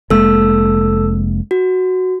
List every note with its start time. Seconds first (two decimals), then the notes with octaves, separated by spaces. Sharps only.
0.10 F1 G#3 A#3 A4 E6
1.51 F#4